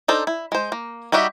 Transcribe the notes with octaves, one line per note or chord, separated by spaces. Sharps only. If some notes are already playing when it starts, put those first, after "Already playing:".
D4 D#4 A4 C5
E4
G#3 C5
A#3
G3 D#4 F#4 G4 E5